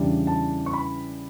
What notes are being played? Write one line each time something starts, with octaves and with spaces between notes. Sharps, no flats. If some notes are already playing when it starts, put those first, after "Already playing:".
Already playing: E2 C#3 E3 G3 D4
A5
C#6
B5